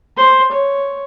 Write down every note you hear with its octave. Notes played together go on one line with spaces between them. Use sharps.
C5 C6
C#5